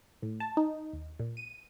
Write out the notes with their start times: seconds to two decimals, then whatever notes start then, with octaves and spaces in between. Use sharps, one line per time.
0.22 A2
0.40 A5
0.57 D#4
0.93 D#2
1.20 A#2
1.37 D#7